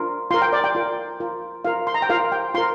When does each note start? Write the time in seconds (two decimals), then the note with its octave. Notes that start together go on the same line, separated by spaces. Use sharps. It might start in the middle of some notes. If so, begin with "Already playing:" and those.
Already playing: D4 F4 A#4
0.31 F4 A#4 C6
0.42 G5
0.53 D5
0.64 G5
0.75 F4 A#4
1.20 F4 A#4
1.65 F4 A#4 F5
1.87 C6
1.94 A#5
2.02 G5
2.09 F4 A#4 F5
2.32 G5
2.54 F4 A#4 C6